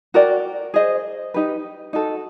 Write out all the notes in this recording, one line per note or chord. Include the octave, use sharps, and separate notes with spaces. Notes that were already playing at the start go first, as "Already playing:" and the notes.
F#4 A#4 D5 G5
G#4 C5 D#5
D#4 G4 B4
D#4 F#4 A4